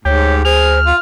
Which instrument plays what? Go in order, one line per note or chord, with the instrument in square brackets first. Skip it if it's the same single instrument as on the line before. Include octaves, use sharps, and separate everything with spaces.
[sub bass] D2 [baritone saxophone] G#2 [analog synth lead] G4 [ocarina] C#5
[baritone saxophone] G#4 [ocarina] C5 [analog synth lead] F6
[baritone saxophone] F4 [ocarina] F5